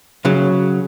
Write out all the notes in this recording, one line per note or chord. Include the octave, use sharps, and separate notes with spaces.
C#3 F#3